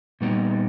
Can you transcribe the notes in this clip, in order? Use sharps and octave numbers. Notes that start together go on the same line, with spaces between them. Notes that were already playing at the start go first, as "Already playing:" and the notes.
A#2 G3 B3 D#4 G4